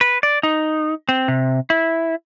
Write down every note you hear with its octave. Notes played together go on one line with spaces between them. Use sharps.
B4
D5
D#4
C4
C3
E4